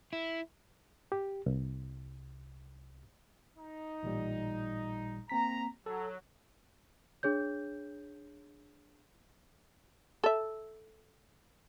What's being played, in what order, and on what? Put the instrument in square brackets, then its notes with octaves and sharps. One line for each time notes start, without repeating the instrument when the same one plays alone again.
[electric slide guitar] E4
[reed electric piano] G4
C2
[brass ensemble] D#4
[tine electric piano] A1 A#2 G3
[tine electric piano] A#3 C4 B6 [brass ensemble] A#5
[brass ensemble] F#3 [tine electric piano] A4
[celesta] D4 G#4 C#5 G6
[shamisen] A4 E5